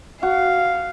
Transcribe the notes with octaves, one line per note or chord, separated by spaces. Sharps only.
F#4 F5